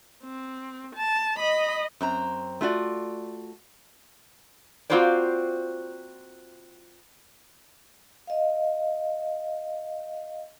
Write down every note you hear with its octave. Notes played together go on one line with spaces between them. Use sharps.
C4
A5
D#5 B5
F#2 C4 A#5
A3 F4 F#4 D5
A#3 C4 F4 F#4 C5 D5
D#5 F5